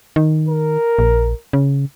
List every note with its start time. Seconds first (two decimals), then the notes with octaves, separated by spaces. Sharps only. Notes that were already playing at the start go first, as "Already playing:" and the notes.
0.16 D#3
0.49 A#4
0.99 A#1
1.53 C#3